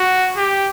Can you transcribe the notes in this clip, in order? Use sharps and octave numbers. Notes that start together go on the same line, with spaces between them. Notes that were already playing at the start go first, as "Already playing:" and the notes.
Already playing: F#4
G4